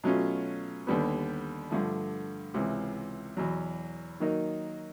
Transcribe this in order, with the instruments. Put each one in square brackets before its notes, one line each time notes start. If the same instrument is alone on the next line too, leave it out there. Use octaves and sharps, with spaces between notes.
[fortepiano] B2 F#3 A3 C#4 F4
D#2 D3 G3 B3
G2 D3 F3 A3
C#2 C3 E3
E2 B2 F#3
D#3 F#3 A#3 D#4